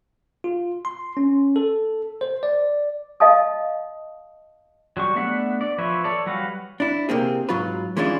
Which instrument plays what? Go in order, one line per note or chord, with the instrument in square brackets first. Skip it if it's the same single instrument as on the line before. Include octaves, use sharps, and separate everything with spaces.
[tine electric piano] F4
C6
C#4
A4
C5
D5
[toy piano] D#5 F5 A5 D#6
[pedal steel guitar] F#3 G3 C#6
A3 B3 D4 E5 F#5
D5
F3 B4 C#5 E5
A4 C#5 D5
F#3 G3 F#4 B4 F5
[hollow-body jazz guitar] D4 E4
C3 A#3 C4 G#4
G#2 F#3 F4 B4
E3 G#3 C#4 D4 E4 F4